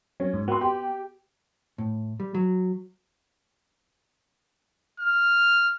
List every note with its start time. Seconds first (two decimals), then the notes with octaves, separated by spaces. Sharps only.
0.20 F#3 C#4
0.33 G#2
0.48 B3 F#4 B4 C6
0.61 G4
1.78 A2
2.20 G3
2.34 F#3
5.00 F6